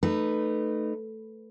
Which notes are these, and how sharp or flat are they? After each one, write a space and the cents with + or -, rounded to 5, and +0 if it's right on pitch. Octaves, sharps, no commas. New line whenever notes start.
A3 +0 D#4 -25 B4 +5